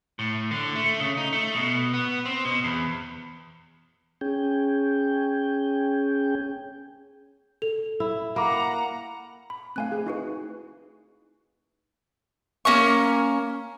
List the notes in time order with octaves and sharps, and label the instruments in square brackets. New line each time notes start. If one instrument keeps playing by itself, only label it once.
[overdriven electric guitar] A2
D3
A3
C#3
D#4
A3
B2
B3
C4
B2
E2
[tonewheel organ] C#4 G#4 G5
[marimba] A4 [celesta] F7
[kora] E4
[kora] A#3 [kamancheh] F#5 A#5 [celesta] B5 D6
[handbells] B5
[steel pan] A3 C4 [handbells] F5 G#5 F#6
[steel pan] G#4
[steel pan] D#4 [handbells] E4 F#4 B4
[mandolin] A#3 C#4 G#5 C#6